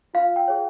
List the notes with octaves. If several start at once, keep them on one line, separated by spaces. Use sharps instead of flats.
F4 F5
G5
G#4 C#5